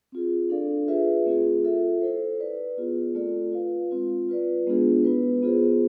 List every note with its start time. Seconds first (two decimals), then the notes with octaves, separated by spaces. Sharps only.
0.12 C4 F4 G#4
0.50 D4 A4 D5 F5
0.88 F4 G#4 B4 E5
1.26 A3 C4 F4 G#4
1.64 F4 A4 E5
2.02 E4 A4 C5
2.40 E4 B4 D5
2.77 B3 F4 G#4
3.15 A3 C4 F4 A4 D5
3.53 F4 B4 F5
3.91 G#3 C4 F4
4.29 F4 B4 D5
4.67 G#3 B3 D4 F4 G#4
5.05 B3 E4 B4
5.43 B3 F4 G#4 C5